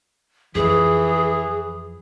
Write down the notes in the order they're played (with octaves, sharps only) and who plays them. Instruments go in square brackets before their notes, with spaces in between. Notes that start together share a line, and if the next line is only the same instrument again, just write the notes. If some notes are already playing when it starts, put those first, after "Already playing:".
[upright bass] F2 [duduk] E3 [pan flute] G#4